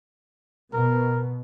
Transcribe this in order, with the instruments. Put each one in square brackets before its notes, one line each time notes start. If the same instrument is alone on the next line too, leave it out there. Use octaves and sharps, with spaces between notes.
[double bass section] B2 [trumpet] A#4